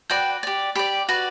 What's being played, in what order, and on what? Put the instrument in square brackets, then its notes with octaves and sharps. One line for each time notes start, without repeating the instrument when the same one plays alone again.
[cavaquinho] F#4 B4 D5 G5
G4 D5
G4 D5 B5
F#4 B4 D5